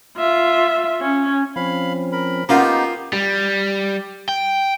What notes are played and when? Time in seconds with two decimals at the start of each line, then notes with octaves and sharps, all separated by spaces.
0.17 F4 E5
1.01 C#4
1.56 F3 C4 C#4 F5 B5
2.12 A#4 B5
2.49 A#3 B3 C#4 D#4 F4 G4 F5 F#5
3.13 G3
4.29 G5